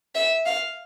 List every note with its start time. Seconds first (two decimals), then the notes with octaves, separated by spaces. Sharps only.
0.15 E5
0.46 F5